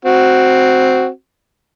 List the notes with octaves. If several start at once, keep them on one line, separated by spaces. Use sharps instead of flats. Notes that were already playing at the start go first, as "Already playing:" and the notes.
C4 F#4